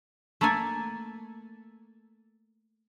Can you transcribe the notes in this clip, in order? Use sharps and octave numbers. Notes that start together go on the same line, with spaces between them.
A3 A#3 A4 D5 G#5